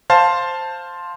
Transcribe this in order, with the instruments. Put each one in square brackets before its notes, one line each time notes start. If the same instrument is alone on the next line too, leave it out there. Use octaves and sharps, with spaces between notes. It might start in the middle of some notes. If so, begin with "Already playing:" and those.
[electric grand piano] C5 F5 A5